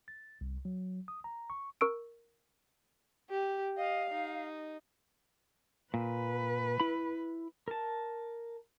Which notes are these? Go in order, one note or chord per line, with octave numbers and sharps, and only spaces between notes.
A6
C2
F#3
D#6
A#5
C#6
A#4 C#6 E6 D7
G4
D#5 F5
D#4
A#2 B4
E4 B5
A#4 A5